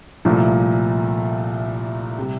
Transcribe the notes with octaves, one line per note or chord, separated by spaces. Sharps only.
C2 A#2 F3 A3
C3 G3